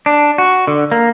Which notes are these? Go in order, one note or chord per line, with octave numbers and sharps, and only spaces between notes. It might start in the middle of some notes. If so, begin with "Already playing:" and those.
D4
F#4
D3
A#3